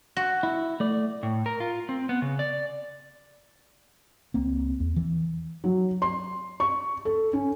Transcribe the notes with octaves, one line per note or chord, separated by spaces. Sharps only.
F#4
E4
A3 D5
A2
A#4
F4
C4
B3
C#3
D5
C#2 A#3 C4
E2
E3
F#3
C6
C#6
A4
C#4